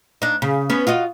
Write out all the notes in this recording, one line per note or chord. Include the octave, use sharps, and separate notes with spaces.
D4 D#4
C#3
B3 C#4
F4 F#4 D#5